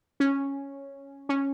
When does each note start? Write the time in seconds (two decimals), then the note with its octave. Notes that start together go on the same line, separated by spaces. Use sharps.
0.20 C#4
1.29 C#4